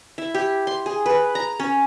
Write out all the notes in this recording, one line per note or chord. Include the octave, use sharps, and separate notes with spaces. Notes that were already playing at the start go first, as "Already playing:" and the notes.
E4
G4
C6
G#4
B4
A#5
C#4